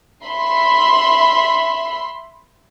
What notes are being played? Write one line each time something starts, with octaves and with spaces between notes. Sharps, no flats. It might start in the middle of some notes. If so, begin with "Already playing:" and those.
E5 B5 C6